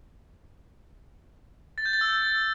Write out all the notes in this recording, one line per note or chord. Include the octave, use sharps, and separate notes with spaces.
A6
G6
A6
E6